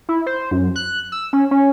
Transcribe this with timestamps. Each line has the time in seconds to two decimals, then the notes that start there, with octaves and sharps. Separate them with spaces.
0.09 E4
0.26 C5
0.51 F#2
0.76 F#6
1.12 E6
1.33 C#4
1.51 C#4